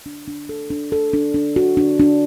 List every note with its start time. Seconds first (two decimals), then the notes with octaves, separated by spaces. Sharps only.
0.06 D4
0.28 D4
0.49 A4
0.70 D4
0.92 A4
1.13 D4
1.34 D4
1.56 F#4
1.77 D4
2.00 D4